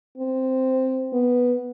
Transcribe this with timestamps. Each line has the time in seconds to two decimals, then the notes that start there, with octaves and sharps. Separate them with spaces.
0.18 C4
1.13 B3